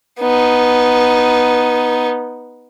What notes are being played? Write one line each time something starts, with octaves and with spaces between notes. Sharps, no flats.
B3 D#4